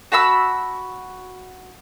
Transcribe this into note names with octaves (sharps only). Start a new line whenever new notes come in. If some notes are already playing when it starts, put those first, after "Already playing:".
F#4 A5 B5 E6